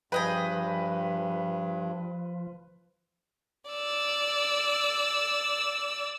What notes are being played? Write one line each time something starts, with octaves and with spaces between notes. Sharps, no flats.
G2 F3 G#4 B4 D#5 G5
D5 E6